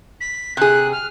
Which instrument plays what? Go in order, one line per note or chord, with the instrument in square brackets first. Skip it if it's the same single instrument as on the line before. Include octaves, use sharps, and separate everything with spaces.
[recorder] B6
[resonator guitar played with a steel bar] C3 G#4 [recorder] F#6
[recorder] F6